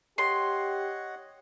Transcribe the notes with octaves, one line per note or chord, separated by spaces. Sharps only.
G4 C#5 D#5 F#5 C6